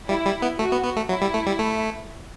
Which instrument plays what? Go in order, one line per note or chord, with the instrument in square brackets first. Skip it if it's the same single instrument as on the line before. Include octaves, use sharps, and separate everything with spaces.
[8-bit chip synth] G3 [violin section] E4
[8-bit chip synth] G3
B3
[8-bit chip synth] A3 [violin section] F#4
[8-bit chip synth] B3
B3
A3
[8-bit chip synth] F#3 [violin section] E4
[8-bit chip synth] G3
A3
G3
A3